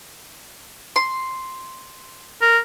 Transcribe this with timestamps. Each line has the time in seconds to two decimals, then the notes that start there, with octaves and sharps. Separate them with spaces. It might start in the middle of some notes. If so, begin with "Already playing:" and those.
0.96 C6
2.42 A#4